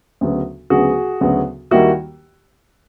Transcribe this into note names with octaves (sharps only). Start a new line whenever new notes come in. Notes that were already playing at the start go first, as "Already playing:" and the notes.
D2 C#3 F#3 B3
D2 C#3 F#3 B3 F#4 G#4
D2 C#3 F#3 B3
D#2 D#3 G3 A#3 E4 F#4